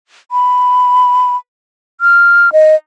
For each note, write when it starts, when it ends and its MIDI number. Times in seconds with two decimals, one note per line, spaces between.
0.32 1.36 83
2.01 2.52 89
2.52 2.75 75